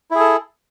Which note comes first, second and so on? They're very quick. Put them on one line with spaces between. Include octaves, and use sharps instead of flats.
E4 G#4 A4